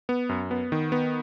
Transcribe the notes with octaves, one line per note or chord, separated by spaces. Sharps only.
B3
F#2
B3
D#3
B3